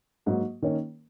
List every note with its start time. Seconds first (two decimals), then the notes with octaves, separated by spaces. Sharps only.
0.26 G#2 F#3 A#3 F#4
0.62 D#3 A#3 C#4 A#4 C#5